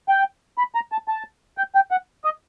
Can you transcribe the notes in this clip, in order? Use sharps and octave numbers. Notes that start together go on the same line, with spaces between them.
G5
B5
A#5
A5
A5
G5
G5
F#5
D#5